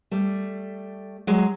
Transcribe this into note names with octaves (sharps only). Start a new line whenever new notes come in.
G3 A3
F#3 G#3